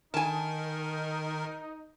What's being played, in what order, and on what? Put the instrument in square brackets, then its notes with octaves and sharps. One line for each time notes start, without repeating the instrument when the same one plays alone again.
[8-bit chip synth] D#3 A#4 [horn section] D#4 [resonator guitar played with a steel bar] G#5 A5